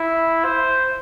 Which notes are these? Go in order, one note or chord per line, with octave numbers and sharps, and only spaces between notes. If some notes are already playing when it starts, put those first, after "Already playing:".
Already playing: E4
C5